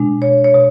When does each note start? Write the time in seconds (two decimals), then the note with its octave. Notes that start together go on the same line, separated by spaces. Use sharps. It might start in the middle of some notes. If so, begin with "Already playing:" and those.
Already playing: B2 G#3 D4
0.22 C#5
0.44 C#5
0.54 B2